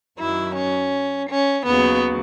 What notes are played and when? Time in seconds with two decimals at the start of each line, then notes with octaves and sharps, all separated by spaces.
0.18 F#2 D#3 F#3 E4
0.55 C#4
1.29 C#4
1.65 D#2 C#3 F#3 B3